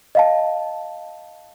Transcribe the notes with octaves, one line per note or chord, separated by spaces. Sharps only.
D#5 F5 A5